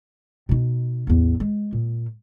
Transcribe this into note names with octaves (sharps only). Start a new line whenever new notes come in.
B2 D#4
A1 E2
G#3
A#2